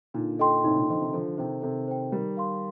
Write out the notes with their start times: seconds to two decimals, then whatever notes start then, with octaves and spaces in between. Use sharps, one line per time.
0.14 A#2 D3 D#4
0.39 A4 D#5 G5 C6
0.64 A2 C3 D#4
0.76 A#2 D3
0.89 D3 F3 A4 D#5 G5 C6
1.01 C3 D#3
1.13 D3 F3 A4
1.38 C3 D#3 C5 G5
1.62 C3 D#3 A4
1.88 C5 G5
2.12 D#3 G3 A#4
2.37 F5 C6